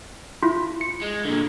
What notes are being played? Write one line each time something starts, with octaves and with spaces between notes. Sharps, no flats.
E4 F4
C#7
G#3
A#2 D3